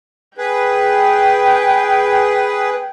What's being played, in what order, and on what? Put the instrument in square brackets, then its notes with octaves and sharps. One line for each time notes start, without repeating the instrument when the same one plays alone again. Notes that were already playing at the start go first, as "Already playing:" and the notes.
[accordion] G#4 B4 [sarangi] G5